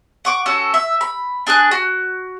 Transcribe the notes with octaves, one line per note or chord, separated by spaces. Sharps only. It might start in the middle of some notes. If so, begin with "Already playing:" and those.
F#5 C#6 D6
C#4 F#4 A4
E5
B5
D4 G#4 G#5 F#6
F#4